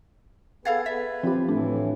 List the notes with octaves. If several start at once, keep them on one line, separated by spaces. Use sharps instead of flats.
B3 G#4 A4 B4 F5 F#5 G#6 A6
B4 E5
F3 C4 G4
A2 E3 A3 D4